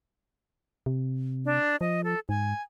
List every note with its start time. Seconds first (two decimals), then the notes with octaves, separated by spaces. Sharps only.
0.86 C3
1.45 D4
1.81 F3 D#5
2.04 A4
2.29 G#2 G#5